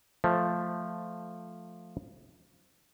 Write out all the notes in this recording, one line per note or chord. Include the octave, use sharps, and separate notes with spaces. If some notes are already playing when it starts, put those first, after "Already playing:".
F3 A3